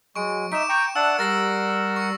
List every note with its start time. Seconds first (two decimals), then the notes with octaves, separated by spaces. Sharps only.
0.16 F#3 G#3 C#6 D7
0.52 D#4 E5 D6 D7 E7
0.69 G5 A#5 C#6
0.95 D4 E5 F#5 A5 E6
1.19 G3 A#4 F#5 A6 A#6 C7
1.96 C#6 C#7